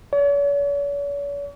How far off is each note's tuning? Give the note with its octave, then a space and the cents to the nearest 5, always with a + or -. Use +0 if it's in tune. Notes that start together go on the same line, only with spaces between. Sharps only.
C#5 +45